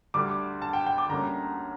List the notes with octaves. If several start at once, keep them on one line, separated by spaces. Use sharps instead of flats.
D2 D3 G3 D6
A5
G5
G5
D6
D2 D3 G3 A#3 C#4 A#5